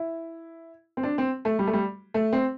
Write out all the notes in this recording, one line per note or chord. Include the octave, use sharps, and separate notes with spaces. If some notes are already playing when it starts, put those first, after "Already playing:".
Already playing: E4
C4
D4
C4
A3
G3
A3
G3
A3
C4